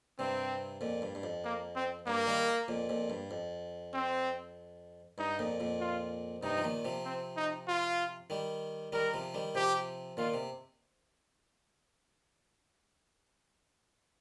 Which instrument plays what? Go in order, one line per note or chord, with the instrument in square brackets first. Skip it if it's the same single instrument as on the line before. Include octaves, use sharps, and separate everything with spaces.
[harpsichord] G2 C3 [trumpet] C4
[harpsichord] F2 A#2
G2
G2
F2
[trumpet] A#3
C4
[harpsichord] G2 [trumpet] A#3
[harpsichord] D#3 G3
F2 A#2
F2 A#2
G2
F2
[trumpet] C4
[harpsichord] G2 [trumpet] D#4
[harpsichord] F2 A#2
F2 A#2
[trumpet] F4
[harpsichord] G2 C3 [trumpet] D#4
[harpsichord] F3
A#2 D#3
C3 F3
[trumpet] C4
D#4
F4
[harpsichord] D#3 G3
[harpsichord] D#3 G3 [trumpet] A#4
[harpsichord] C3 F3
D#3 G3
[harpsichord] C3 F3 [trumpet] G4
[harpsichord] A#2 D#3 [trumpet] F4
[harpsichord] C3